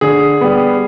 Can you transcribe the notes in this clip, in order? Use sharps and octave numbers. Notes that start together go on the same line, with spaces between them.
D3 G#4
G3 B3